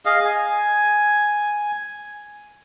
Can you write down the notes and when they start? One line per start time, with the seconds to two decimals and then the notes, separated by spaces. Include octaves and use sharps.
0.05 G#4 D#5 F5
0.25 G#5